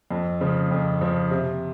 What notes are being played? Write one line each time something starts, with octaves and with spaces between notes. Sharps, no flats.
F2
C#3 F3
F2
C#3 F3
C3